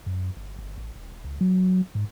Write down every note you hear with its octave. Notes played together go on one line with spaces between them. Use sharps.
F#2
G1
G1
A1
D#1
C#2
F#3
G#2